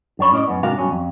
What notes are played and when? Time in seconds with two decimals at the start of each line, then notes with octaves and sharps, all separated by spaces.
0.19 F#2 D4 C#5 B5
0.32 A2 C#4 D5 D#5
0.47 F#2 B3
0.63 G#2 C3 D4 F#4 A#4 F5
0.78 G2 B2 F#3 C#4
0.91 F2